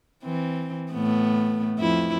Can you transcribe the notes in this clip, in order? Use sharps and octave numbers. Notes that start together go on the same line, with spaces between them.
E3 C4
A2 A3 B3
F2 E4